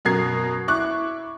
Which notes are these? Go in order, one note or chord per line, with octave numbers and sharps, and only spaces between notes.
F#2 B2 A#4 G#6 C7
E4 C#6 D6 F#6